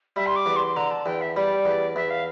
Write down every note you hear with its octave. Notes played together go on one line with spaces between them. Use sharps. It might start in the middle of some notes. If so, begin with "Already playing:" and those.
G3 E5
C6
D6
E2
C6
D3 A#5
A5
E2 G5
E5
G3 D5
E2
E2 E5
F5